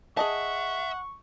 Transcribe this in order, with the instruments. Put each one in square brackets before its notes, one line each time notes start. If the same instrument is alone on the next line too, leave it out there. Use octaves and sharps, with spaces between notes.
[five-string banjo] G#4 D#5 A5 [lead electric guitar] E5 [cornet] F#5 [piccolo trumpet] C#6